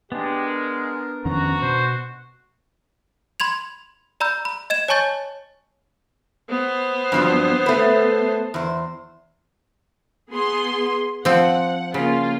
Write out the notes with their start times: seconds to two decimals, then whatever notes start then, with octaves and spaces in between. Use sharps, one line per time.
0.12 G#3 B3 D4 G4
0.47 A#4
1.25 F2 D#3 C#4 F#4 A#5
1.62 B2 C5
3.40 B5 C6 G#6 F7
4.20 D5 A#5 B5 E6 G6
4.45 B5
4.70 D#5 G#6 E7
4.88 C#5 G#5 A5 C#6 G6 A6
6.50 B3 C5
7.12 G2 F3 F#3
7.66 A3 B4
8.54 E2 C5
10.31 B3 G#4 C6
11.25 F3 C4 F#5
11.94 C#3 A#3 F4